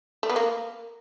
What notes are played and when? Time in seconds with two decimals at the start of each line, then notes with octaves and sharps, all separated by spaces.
0.23 A3
0.30 B3
0.36 A#3